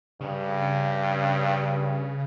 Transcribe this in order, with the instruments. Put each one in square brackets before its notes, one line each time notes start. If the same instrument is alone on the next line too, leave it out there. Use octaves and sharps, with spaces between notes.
[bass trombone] G2 [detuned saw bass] C#3